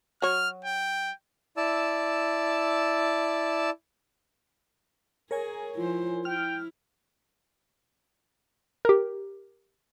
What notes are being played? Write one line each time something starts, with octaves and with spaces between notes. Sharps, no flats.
F#3 C#5 F6
G5
E4 D5 A5 E6
G#4 A#4 C#5 G#5
F3 E4 F4 C5
E4 G5 F6
G4 A#4